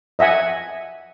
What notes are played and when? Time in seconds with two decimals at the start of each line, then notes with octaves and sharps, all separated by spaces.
0.19 D#5 E5 F#5 G#5